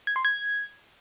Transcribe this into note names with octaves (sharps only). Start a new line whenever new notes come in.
G#6
C6
G#6